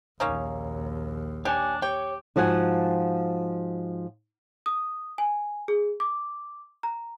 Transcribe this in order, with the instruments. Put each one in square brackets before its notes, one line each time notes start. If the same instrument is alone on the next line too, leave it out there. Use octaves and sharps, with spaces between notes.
[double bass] A#1 D#2 [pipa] A#3 C#4 D#4
[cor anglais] D4 [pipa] G4 [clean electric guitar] C#5 G#5 A5
[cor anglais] G4 [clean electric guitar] C#5 [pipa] G5
[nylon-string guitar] G#2 F3 F#4 F#5 G#5
[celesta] D#6
G#5
G#4
D6
A#5